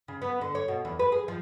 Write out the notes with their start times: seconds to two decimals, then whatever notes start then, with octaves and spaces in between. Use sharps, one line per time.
0.08 C#3
0.22 B3
0.41 D3
0.55 C#5
0.68 B2
0.85 E2
0.99 B4
1.12 G#4
1.28 F3